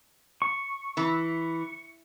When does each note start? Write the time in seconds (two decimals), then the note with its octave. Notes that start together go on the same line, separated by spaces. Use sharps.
0.42 C#6
0.97 E3